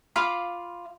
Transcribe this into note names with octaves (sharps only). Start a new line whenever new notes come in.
F4 F5 B5 D6